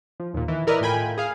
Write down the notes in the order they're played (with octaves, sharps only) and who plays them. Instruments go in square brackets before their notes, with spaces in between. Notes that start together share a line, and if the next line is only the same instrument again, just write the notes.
[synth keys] F3
D#2 A#2
D#3 E3
E4 A#4 B4 D5 D#5
A2 F4 G5 G#5 B5
G#4 F5